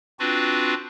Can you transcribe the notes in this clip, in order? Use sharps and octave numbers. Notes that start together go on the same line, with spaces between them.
C4 D4 F4 F#4 B4